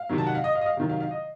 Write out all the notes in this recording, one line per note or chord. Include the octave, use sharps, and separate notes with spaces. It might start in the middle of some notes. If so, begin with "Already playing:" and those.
Already playing: F5
C3 D#3 F#3
A5
F#5
F5
D#5
F5
D#5
F5
C3 D#3 F#3
F5
F5
D#5